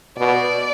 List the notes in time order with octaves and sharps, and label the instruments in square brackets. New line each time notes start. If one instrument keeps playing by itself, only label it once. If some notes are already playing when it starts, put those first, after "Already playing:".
[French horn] B2 [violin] D5